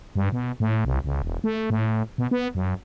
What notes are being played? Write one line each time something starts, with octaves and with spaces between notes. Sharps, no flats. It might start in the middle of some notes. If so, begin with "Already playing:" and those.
G2
B2
A2
C2
C#2
E1
A3
A2
B2
B3
F#2